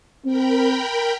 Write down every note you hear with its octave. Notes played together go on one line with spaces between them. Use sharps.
C4 A#4 G5 B5